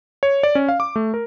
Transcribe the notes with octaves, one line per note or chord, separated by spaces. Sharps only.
C#5
D5
C#4
F5
D6
A3
A#4